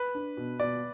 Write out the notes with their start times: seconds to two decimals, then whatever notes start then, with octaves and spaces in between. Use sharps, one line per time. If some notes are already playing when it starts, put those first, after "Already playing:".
Already playing: B4
0.15 D4
0.37 B2
0.60 B2 D5